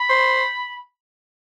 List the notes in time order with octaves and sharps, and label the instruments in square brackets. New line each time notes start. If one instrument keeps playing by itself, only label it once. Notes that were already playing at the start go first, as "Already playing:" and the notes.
Already playing: [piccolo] B5
[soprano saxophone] C5